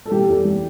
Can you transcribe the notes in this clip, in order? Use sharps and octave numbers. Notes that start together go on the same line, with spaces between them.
A4
E3 G4
E2
E3